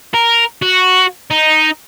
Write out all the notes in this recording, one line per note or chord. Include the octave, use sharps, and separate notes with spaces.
A#4
F#4
D#4